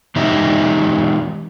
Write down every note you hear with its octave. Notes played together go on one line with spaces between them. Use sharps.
E3 G#3 D#4 G4 D#5 E5